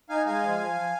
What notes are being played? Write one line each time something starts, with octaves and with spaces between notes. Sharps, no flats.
D#4 F5 G#5
G#3 F5 G#5
F3
F3
F3